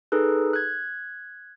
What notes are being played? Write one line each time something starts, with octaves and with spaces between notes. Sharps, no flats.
D#4 G#4 A4 B4
F#6 G#6